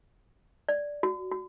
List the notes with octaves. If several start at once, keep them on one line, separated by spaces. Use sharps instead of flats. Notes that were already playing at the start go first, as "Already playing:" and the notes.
D5
F#4
F#4